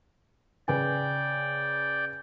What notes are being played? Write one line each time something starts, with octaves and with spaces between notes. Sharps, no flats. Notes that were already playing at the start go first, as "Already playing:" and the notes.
C#3 B4 D5 G5 G#5